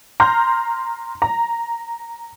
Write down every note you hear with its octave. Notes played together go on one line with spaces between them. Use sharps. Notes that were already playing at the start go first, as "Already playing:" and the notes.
A#5 C6 F6 G6
A#5